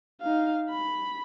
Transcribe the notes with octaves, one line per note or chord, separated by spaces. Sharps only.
D#4 F5
B5